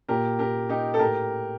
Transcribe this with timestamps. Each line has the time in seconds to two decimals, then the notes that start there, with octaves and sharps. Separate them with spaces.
0.09 A#2 G4 A#4
0.39 G4 A#4
0.69 D#4 G4
0.94 A4
0.99 A2 G4 A#4